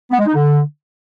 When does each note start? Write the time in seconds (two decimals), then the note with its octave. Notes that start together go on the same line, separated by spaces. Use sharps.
0.11 B3
0.19 G#3
0.27 D#4
0.34 D3